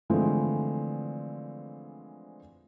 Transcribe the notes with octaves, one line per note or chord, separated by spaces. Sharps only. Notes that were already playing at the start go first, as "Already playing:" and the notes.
D3 E3 F3 G#3 A3 C4